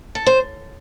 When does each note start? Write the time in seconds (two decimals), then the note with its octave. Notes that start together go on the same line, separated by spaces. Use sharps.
0.15 A4
0.26 C5